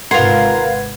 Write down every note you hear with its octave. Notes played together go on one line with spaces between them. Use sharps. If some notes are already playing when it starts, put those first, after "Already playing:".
G#1 C3 F4 A#4 B4 F#5 C6 G#6